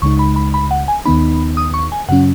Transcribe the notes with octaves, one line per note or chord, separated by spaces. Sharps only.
C#2 C#3 G#3 D#4 C#6
B5
B5
B5
F#5
G#5
D#2 D#3 B3 D#4 B5
D#6
C#6
G#5
F#2 C#3 F#3 C#4 F#5